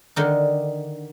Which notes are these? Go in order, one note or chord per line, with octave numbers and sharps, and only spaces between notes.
D3 D#3 D#4